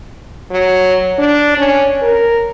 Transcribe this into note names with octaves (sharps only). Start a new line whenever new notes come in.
F#3
D4
C#4
A#4